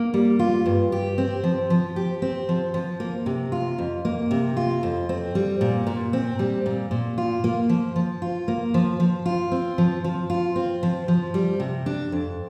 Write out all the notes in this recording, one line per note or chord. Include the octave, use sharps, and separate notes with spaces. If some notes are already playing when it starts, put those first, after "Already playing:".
Already playing: A#3
G3
F4
G2
G4
C4
F3
F3
G4
C4
F3
F3
A#3
C3
F4
F2
A#3
C3
F4
F2
C4
G3
A#2
A#2
C4
G3
A#2
A#2
F4
A#3
F3
F3
F4
A#3
F3
F3
F4
C4
F3
F3
F4
C4
F3
F3
G3
C3
D4
F2